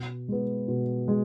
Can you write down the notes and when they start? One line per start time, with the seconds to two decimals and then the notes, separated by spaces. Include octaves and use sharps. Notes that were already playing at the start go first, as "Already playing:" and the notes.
Already playing: B2
0.28 G#3 B3
0.68 B2
1.08 G#3